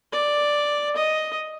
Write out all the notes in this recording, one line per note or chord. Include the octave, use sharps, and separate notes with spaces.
D5
D#5